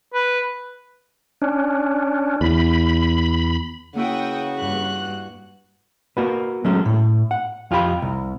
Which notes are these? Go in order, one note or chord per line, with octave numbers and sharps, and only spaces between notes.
B4
C#4 D4
E2 B5
C#3 A#3 E4 F#4 B4 F#5 G5 D#6
G2 B4 F#6
A#3 F#4 B4
F#3 G#3 A3 C#4 F#4
A2
F#5
F2 F4 G4 A#4 B5
C2